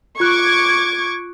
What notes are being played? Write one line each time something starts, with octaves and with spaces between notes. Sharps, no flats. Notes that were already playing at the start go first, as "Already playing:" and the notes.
F4 C#6 D6 F#6 G#6